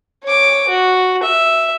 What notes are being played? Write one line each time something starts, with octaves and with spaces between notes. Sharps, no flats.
C#5 D6
F#4
E5